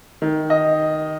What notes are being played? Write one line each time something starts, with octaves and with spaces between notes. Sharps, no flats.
D#3
D#5